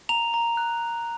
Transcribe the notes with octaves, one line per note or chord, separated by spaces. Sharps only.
A#5 F7
A#5
F#6